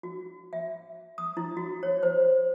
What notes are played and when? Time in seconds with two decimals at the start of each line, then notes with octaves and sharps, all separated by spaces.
0.03 F#4
0.53 E5
1.18 D#6
1.37 E4
1.57 F#4
1.83 C#5
2.03 C5